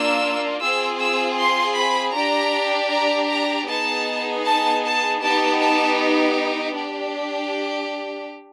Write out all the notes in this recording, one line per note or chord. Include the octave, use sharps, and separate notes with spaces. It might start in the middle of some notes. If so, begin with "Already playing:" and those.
Already playing: A#3 D4 F4 E6
C4 F4 G#4 E6
E6
C6
B5
D4 G4 A#5
A#5
A#5
B3 D#4 G#4 A5
A5
A5
B3 D#4 G4 A5
A5
D4 G4